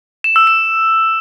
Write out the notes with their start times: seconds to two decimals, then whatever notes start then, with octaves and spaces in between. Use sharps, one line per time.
0.24 E7
0.36 E6
0.47 E7